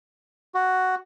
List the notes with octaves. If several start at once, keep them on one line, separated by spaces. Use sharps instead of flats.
F#4